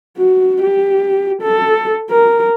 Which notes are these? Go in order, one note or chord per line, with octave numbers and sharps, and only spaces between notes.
F#4
G4
A4
A#4